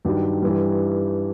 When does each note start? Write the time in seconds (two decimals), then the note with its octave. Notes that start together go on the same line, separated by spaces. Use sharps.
0.05 G2 D#3 F#3
0.42 G2 E3 G3